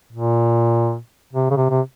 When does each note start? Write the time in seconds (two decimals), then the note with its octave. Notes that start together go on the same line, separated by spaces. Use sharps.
0.13 A#2
1.33 C3
1.51 C#3
1.57 C3
1.70 C3